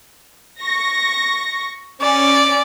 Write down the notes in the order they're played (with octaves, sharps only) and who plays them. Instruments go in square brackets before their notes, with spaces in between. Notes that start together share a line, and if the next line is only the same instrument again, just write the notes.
[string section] C#6 A#6
[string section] C#4 [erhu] D5